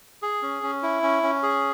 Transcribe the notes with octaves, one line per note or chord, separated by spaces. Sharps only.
G#4
C#4
C#4
E4
C#4
C#4
G#4